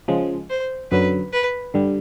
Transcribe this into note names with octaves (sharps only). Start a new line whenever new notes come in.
C#3 F3 G#3
C5
F#2 D3 F#3 B4
B4
G2 D3 G3